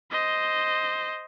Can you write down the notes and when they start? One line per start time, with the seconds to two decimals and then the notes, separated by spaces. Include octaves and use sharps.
0.11 C5 D#5